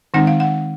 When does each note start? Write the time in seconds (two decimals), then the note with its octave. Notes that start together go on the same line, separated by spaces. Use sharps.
0.14 D#3 G#3 C4 D#4 F#5
0.27 F5
0.40 F#5